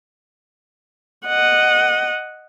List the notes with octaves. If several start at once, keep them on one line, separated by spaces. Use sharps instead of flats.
D#5 F#5